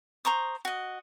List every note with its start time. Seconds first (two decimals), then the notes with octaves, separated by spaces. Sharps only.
0.25 C5 A#5 C#6 D#6
0.65 F#4 D#5